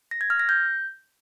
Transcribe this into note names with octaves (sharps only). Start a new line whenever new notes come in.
A#6
G#6
F6
A#6
G6